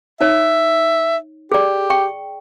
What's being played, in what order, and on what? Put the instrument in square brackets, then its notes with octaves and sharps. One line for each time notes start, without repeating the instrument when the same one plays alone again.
[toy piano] D#4 C#5 [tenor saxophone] E5
[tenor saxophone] G4 [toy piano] G#4 D5
[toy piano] G5 C#6